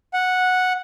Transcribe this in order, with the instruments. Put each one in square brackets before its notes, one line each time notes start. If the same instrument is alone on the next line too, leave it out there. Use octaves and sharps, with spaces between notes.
[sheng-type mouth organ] F#5